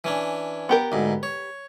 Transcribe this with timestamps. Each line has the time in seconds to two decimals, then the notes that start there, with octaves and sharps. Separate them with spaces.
0.04 E3 C#4 D4
0.69 B3 G4 A#4
0.92 D2 G#2
1.23 C#5